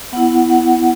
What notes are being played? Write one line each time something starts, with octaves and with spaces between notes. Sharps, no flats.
B3 E4 F#5
F#5